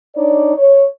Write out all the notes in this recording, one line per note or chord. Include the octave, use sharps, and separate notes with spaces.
D4 D#4 C#5 D5
C#5